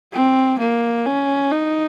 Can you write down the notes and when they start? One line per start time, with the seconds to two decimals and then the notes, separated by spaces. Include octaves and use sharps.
0.13 C4
0.59 A#3
1.06 C#4
1.52 D#4